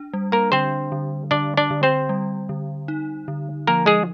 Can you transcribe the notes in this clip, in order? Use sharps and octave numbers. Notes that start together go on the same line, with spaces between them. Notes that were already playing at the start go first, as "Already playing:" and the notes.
Already playing: D4
G3
A#3 A#4
D3 C4 C5
D3
D3 D4 D5
D4 D5
D3
C4 C5
G3
D3
D#4
D3
F3 A#3 A#4
G#3 G#4